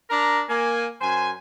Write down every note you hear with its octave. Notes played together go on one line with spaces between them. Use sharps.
D4 A#4 A#5
A#3 G#5
F#2 C5 G#5